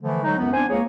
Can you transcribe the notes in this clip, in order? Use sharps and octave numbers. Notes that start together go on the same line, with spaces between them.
D3 E3 F3 A3
D3 F#3 G#3 D#4
C#2 F#2 B3
C4 D4 C5 G#5
C#2 A#3 G#4 C#5